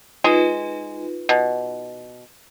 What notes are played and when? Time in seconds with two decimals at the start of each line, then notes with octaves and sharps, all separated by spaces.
0.24 G#3 D#4 F4 B4
1.29 B2